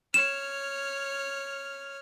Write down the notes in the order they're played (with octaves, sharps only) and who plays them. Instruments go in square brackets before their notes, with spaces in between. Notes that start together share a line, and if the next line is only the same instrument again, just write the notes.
[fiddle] C#5 F6 [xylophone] E7